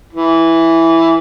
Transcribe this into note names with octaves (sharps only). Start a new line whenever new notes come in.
E3